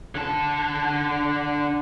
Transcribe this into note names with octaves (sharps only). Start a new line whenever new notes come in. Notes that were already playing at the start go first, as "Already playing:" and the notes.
D3 A5